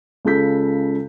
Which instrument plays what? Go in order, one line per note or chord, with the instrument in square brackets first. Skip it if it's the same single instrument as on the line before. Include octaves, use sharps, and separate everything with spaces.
[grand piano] C#2 C#3 A4 G6 B6